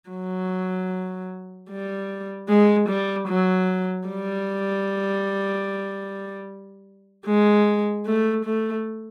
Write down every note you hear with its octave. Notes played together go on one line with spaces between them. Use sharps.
F#3
G3
G#3
G3
F#3
G3
G#3
A3
A3